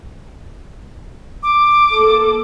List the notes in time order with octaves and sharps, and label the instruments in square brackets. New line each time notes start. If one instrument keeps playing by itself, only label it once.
[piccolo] D6
[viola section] A#3 A4